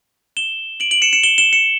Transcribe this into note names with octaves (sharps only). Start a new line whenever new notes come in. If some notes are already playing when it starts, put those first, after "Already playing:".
E7 G7
D7 F#7
D7 F#7
C#7 E7
C#7 E7
E7 G7
E7 G7
C#7 E7